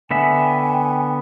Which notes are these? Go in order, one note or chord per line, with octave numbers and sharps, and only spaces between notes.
D3 B3 E5 G5 G#5